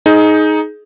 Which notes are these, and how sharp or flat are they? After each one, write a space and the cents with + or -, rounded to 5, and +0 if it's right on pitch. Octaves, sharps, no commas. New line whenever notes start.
D#4 +5 G#4 +20